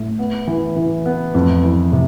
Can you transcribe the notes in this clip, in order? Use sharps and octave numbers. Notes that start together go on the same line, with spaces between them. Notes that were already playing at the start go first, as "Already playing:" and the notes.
Already playing: A2
B3
E3
E3
B3
F2
E3
C3